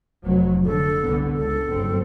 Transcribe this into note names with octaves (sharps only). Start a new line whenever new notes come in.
F1 F#3
D3 A4
C2 D3 B3
C#2 A4
F#1 G2 C4